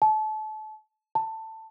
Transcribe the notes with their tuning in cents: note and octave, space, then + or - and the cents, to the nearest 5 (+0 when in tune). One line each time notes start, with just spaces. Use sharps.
A5 -30
A5 +15